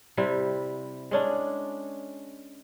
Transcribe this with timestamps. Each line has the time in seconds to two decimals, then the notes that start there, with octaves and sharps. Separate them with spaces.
0.17 C3 G3 C4 E4
1.11 G#3 C#4 D4